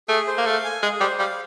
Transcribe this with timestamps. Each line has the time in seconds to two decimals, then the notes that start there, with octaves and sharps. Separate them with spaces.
0.09 A3 G#4
0.27 C5
0.38 A#3
0.46 A3 F5
0.64 G#5
0.82 G#3 G#4
1.00 G3 C5
1.19 G3 F5